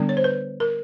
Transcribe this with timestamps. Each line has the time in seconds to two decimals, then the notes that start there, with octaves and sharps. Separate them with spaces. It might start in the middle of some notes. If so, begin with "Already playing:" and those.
Already playing: D3 G3 B3 D4
0.09 C#5
0.17 C5
0.24 B4
0.60 A#4